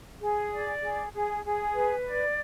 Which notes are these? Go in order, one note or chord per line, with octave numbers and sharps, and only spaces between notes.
G#4
D5
G#4
G#4
G#4
B4
D5